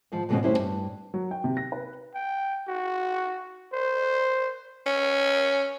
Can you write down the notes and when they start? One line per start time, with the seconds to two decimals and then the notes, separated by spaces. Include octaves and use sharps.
0.12 G#2 D#3 F3
0.29 F2 G#2 B2 D#3 C4 C#4
0.43 D2 G2 C#4 E4 G4 C5
0.59 G2
1.14 F#3
1.31 G5
1.44 C3
1.57 A#6
1.72 B4
2.15 G5
2.68 F#4
3.73 C5
4.86 C#4